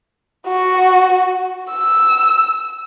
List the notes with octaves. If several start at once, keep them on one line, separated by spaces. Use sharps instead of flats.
F#4
E6